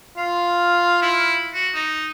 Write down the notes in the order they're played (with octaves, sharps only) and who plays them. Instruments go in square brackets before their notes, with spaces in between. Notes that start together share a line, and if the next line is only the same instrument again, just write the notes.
[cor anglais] F4 [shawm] F5
[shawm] E4
F#4
D#4